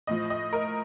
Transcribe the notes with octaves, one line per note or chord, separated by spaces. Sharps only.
A2 F3 D#5
D#5
A#4